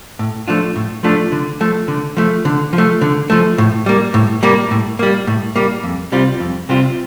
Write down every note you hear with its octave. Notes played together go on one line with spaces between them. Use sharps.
A2
F3 A3 D4 F4
A2
F3 A3 D4 F4
D3
F3 A3
D3
F3 A3
D3
F3
A3
D3
F3 A3
A2
G3 A#3
A2
G3 A#3
A2
G3 A#3
A2
G3 A#3
F2
C3 G3 C4 F4
F2
C3 G3 C4 F4